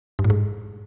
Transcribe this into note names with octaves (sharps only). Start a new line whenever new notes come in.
G2
A2
G#2